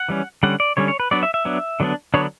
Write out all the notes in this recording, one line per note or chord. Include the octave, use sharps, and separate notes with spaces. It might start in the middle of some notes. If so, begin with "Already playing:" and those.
Already playing: F#5
E3 G3 C#4
D3 G3 C#4 F#5
D5
D3 G3 C#4 C#5
C#5
B4
F#3 B3 D4 D5
E5
E5
F#3 B3 D4
D3 F#3 B3 D4
D3 F#3 B3 D4 C#5